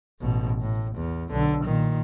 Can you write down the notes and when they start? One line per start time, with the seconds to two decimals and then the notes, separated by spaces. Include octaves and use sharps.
0.21 A1 B2
0.61 A2
0.95 E2
1.31 B1 D3
1.64 A#2 D#3